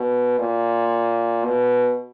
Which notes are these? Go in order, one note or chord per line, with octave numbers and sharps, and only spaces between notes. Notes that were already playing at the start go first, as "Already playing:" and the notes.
Already playing: B2
A#2
B2